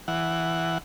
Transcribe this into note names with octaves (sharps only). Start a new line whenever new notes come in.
E3 F#5